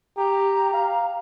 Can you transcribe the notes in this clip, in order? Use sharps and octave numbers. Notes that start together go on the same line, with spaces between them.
G4 A#5
F5